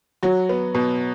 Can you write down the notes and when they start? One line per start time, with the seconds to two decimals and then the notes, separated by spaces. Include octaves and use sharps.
0.23 F#3 F#4
0.49 B3
0.75 B2